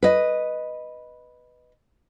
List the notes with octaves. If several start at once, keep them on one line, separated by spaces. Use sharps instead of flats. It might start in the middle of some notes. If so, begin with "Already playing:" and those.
B4 D#5